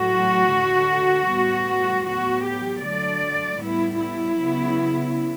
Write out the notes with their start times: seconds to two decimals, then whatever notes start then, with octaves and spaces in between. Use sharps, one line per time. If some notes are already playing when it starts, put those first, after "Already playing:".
Already playing: A2 F#3 A3 F#4
0.52 D3 A3
1.29 A2 G3 B3
2.07 A2 F#3 B3 F#4
2.45 G4
2.84 D3 F#3 A3 D5
3.61 A2 G3 B3 E4
4.00 E4
4.39 C#3 F#3 B3